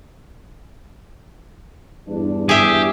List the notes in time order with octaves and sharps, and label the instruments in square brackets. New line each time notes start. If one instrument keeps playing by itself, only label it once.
[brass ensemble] E2 G2 D4
[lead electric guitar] G4 [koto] G#4 E5